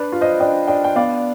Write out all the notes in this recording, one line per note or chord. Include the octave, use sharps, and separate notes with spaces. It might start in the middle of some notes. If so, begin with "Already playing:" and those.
Already playing: D4 B4 D5
F4
C5 D#5
D4 D#5 G5
D4 D#5 G5
G5
B3 D5 F5